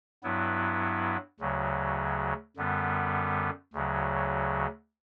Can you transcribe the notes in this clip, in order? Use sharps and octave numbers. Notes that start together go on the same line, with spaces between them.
G2 F#3 B3 E4
D2 C#3 F#3
F#2 D3 G3 B3
D2 C#3 F#3